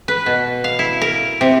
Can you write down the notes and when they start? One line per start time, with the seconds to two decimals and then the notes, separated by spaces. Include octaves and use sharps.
0.08 B4
0.26 B2
0.64 F5
0.79 E4
1.01 A#4
1.41 C3